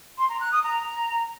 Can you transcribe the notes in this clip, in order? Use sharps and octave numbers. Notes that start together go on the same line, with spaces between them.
C6
A#5
F#6
D#6
A#5